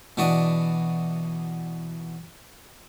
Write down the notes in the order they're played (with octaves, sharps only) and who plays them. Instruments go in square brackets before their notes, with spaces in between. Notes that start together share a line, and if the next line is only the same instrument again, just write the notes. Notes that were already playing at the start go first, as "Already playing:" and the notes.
[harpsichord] B2 E3 D4 F#4 D5 D#6